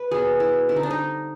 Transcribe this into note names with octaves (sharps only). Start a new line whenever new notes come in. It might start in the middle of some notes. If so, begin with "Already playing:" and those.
Already playing: B4
B2 F#3 B3 G#4
E4
D3 G3 C4 E4
D#4
D4
D#4